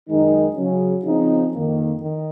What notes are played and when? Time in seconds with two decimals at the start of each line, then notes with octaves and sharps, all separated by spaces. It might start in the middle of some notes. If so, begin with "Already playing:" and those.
0.09 F#2 D#3 G#3 D#4
0.56 C#3 F#3 C#4
1.05 C#3 F3 C4 D#4
1.53 F2 D#3 A#3
2.01 D#3